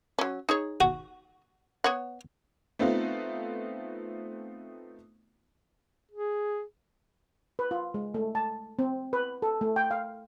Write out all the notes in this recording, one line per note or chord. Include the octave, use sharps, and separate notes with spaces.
F#3 C#4
D#4 G#4 C#5
F#4
B3 C#5 F#5
A3 B3 C4 D#4 F4
G#4
B4
F4
G#3
A3
A5
C4
B4
A4
A3
G5
F5